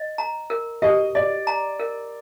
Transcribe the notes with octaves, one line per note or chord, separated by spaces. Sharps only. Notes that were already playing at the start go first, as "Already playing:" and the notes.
Already playing: D#5
A#5
A#4
G4 D#5
D5 D#5
A#5
A#4